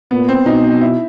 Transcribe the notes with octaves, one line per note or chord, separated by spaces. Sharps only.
A#2 B3
C4
B2 D#4
E4